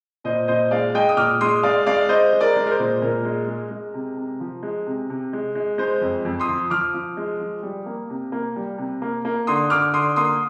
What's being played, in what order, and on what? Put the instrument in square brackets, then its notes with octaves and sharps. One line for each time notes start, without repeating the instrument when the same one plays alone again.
[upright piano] A#2 C5 D#5
A#2 C5 D#5
G#3 D5 F5
G#3 D#5 G5
D#6
A#2 D6 F6
G#3 C6 D#6
G#3 D5 F5
G#3 D5 F5
G#3 C5 D#5
G#3
A#4 D5
G#3
A#4
C5
A#2
A#2 A#4
G#3
G#3
G#3
C3
C3
F3
G#3
C3
C3
G#3
G#3
G#3 C5
F2
F2
C6 D#6
F3
F3 D6 F6
F3
G#3
F3
G3
A#3
C3
A#3
G3
C3
A#3
A#3
D3 C6 D#6
D3 D6 F6
D3 C6 D#6
A#3 C6 D#6